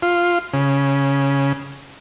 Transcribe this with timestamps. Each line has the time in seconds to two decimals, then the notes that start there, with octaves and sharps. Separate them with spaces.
0.02 F4
0.53 C#3